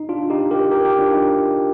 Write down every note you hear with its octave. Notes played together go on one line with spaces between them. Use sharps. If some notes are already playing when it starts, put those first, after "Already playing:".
Already playing: D#4
D4 F4
D#4 G4
G4 A#4
G4 A#4
D#4 G4
D4 F4
D#4